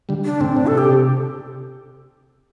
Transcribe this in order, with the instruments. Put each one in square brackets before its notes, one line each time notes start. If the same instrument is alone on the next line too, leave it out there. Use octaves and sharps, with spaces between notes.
[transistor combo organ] D3 G3
[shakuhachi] D4
[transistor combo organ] A2 D3 [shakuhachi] C4
[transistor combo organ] A2 [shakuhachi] D4
[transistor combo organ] C3 [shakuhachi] A4
[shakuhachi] G4